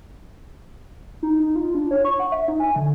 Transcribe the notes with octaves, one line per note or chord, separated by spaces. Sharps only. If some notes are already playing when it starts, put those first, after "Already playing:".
D#4
D#4
F4
D4
C#5
C#6
F#5
E5
D#4
G#5
D3